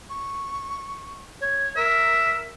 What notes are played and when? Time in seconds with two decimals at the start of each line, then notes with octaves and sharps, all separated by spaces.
0.10 C#6
1.41 C#5
1.76 A#4 E5